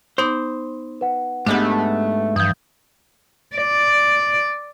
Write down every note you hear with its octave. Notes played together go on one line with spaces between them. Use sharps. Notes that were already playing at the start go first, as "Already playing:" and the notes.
B3 D#4 C5 D6
B4 F#5
G#2 G#3 A3 B3 D4 G4
G2 E3 F3 D#6 G6
D5